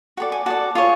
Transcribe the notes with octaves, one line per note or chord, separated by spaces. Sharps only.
F#4 A4 D5 G5
G#5
F#4 A4 D5 A5
F4 G#4 C#5